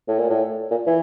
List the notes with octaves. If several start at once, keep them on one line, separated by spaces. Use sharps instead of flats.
A2
A#2
A2
A#2
E3